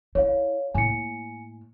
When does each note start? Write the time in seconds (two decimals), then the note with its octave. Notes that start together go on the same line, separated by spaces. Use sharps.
0.15 E4 C#5 F5
0.74 A2 A#3 G#5 C#7